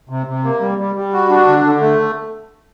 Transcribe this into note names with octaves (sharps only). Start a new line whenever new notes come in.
C3
C3
A#3
G3
G3
G3
F#4
D4
D3
D3
A3